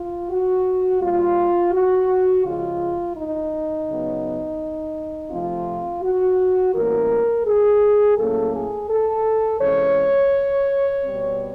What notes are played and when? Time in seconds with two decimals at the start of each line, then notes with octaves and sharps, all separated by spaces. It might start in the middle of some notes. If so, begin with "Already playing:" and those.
Already playing: F4
0.29 F#4
1.01 A#2 G3 C4 F4
1.72 F#4
2.44 C#3 F3 G#3 F4
3.16 D#4
3.87 C#3 F#3 B3
5.30 C3 F3 A3 C4 F4
6.02 F#4
6.74 A2 E3 G3 A#3 C#4 A#4
7.46 G#4
8.17 A2 F#3 A#3 C#4 A4
8.54 G#4
8.90 A4
9.60 C3 E3 G#3 C#4 C#5
11.04 B2 G3 C4